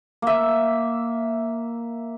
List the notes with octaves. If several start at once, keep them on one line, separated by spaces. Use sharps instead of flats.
A#3 E5